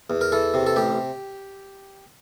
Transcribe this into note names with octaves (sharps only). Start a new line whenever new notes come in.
E2
A#4
E3 A4
C3
A4
A1 G4